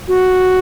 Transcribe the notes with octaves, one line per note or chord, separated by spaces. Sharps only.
F#4